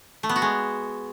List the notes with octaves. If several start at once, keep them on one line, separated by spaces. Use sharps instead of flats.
A3
B3
F#4
G#3